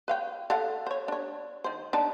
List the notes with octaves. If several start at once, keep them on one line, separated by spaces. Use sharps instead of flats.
B4 F5 G5
A4 F5 F#5
C5 C#5
D4 C#5
D#3 C5
D4 D#4 A5